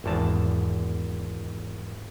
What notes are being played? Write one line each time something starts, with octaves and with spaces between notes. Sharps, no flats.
G#1 E2 A5